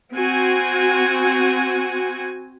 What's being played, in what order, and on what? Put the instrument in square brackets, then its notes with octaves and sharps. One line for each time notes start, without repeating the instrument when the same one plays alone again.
[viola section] C4 F#4 G#5